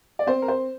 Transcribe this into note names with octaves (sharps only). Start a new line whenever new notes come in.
D5
C4 C5
A#4
C5